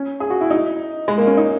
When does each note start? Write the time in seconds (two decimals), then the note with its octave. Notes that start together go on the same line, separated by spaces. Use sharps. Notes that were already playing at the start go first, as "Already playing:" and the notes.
Already playing: C#4
0.20 G#4
0.30 F#4
0.41 E4
0.50 D#4
1.08 G#3
1.18 A#3
1.27 C#4
1.37 D#4